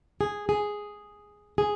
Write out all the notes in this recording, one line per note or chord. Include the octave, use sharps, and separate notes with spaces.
G#4
G#4
G#4